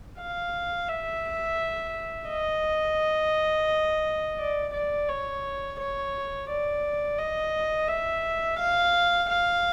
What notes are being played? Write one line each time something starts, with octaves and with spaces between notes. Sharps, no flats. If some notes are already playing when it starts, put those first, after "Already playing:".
F5
E5
D#5
D5
D5
C#5
C#5
D5
D#5
E5
F5
F5